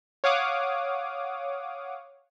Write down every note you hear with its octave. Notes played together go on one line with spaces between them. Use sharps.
C#5 F5 F#5 D6 D#6